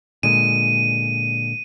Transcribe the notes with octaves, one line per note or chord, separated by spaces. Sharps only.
A#2 D3 G#3 D#7